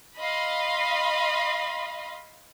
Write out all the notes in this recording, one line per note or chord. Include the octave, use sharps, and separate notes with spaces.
D#5 F5 B5 C6